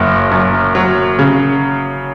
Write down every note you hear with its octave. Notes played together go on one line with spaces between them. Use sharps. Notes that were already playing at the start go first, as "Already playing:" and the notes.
Already playing: F#1 F#2
F#2
F#3
C#3